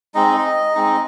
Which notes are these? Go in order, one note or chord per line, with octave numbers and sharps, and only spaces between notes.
G#3 C4 D#4 D#5
G#3 C4 D#4